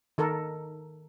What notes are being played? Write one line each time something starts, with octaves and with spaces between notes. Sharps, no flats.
D#3 A4 A#4